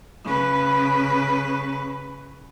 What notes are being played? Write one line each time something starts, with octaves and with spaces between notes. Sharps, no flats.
C#3 B4